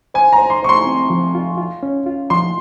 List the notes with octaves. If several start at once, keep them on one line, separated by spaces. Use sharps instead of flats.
C5 G#5
A#5
C5
C6
C5 C#6
C6
C4
F3
F4
F4
C#4
F4
F3 C6